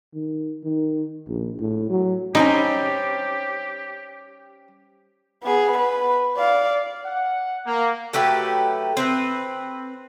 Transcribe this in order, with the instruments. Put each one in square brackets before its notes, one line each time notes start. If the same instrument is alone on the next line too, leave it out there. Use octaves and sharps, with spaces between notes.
[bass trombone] D#3
D#3
A#1
A2
F#3
[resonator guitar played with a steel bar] G3 C4 C#4 [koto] D#4 [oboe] G4
[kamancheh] B3 G#4
B4
D5 F5
[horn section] F#5
A#3
[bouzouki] F#3 A3 G4 B4
C4 B4